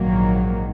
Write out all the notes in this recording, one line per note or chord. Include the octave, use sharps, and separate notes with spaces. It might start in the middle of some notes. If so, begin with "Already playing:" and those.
Already playing: A#1 G#2 D#3 F#3 A#3